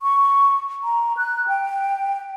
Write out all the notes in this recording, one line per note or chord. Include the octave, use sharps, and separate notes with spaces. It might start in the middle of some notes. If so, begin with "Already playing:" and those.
C#6
A#5
F#6
G5